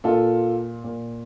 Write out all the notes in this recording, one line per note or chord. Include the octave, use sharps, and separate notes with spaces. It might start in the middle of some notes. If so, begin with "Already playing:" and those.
A#2 F4 A4
A#2